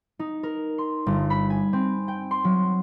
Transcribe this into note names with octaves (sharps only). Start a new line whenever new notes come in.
D#4
A#4
C6
G1
B5
G#5
C4
G5
C6
F#3